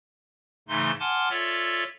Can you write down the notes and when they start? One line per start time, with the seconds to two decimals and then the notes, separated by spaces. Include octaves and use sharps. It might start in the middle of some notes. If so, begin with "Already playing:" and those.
0.68 G#2 C#3 E3 A3 D#4 C6
1.00 F#5 G#5 A5 C6 D6 F6
1.30 F4 A4 C#5 D5 E5